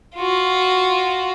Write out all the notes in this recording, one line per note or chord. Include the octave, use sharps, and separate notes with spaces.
F4 F#4